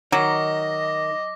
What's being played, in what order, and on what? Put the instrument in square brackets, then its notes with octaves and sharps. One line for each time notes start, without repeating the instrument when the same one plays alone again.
[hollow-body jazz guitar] D#3 [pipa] F#3 [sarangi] D#5 [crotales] D6 A#6